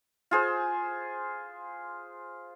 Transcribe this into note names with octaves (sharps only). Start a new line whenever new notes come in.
F4 G#4 C5